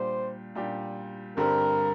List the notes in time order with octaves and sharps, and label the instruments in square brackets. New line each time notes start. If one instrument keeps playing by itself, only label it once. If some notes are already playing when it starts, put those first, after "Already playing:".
Already playing: [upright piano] A#2 G3 D4 G4 [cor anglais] C5
[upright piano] A#2 G3 D4 G4
[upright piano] G2 D3 G3 C4 [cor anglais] A#4